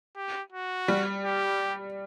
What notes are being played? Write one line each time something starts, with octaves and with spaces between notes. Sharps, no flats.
G4
F#4
G3
G4